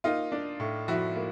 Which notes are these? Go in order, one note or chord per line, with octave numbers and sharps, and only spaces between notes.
A#3 D#4 F4
D4
A2
F3 E4 F#4
A#3